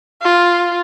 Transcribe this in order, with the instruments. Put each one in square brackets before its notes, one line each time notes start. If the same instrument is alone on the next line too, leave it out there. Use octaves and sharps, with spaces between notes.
[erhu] F4